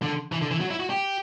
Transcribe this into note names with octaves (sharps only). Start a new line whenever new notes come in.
D3
E3
D3
E3
F#3
E4
F#4
G4